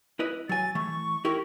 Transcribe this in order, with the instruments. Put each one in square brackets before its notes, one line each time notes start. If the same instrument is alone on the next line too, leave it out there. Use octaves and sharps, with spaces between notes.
[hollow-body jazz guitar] E4 B4 D#5
[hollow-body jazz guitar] F#3 G#5 [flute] A6
[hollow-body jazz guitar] E3 A3 [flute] C#6
[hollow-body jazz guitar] E4 G4 A#4